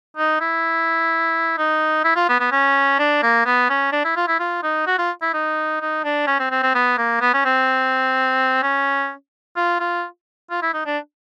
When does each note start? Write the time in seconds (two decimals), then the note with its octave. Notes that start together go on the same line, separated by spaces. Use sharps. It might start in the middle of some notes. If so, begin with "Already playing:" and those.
0.17 D#4
0.41 E4
1.58 D#4
2.04 E4
2.16 F4
2.29 B3
2.40 B3
2.52 C#4
2.99 D4
3.23 A#3
3.46 B3
3.70 C#4
3.93 D4
4.05 E4
4.16 F4
4.28 E4
4.40 F4
4.63 D#4
4.87 F#4
4.98 F4
5.22 E4
5.34 D#4
5.81 D#4
6.04 D4
6.27 C#4
6.39 C4
6.51 C4
6.63 C4
6.75 B3
6.98 A#3
7.21 B3
7.33 C#4
7.45 C4
8.63 C#4
9.57 F4
9.80 F4
10.51 F4
10.62 E4
10.74 D#4
10.86 D4